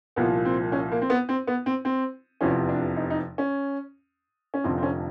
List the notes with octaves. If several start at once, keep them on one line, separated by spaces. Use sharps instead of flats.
C2 A#2 F3 B3
C4
C#4
A#3
C4
B3
C4
B3
C4
C4
F1 E2 C3 F3 C#4
D4
D#4
D#4
C#4
C#4
F1 F2 D3 F3 C4
C4
C#4